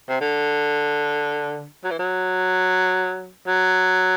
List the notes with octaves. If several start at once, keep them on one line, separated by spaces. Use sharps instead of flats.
C3
D3
F#3
E3
F#3
F#3